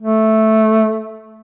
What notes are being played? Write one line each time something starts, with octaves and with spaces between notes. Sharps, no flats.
A3